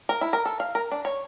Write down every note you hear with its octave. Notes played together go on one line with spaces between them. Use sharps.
A#4
E4
A#4
A4
F5
A#4
D4
C#5